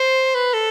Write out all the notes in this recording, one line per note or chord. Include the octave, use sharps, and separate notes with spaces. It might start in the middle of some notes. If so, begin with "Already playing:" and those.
Already playing: C5
B4
A4